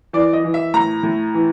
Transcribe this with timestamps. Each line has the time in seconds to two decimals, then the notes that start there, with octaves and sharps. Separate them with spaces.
0.13 E3 D5
0.33 D#5
0.44 E3
0.54 E5
0.74 A2 A#5
1.03 A2
1.34 E3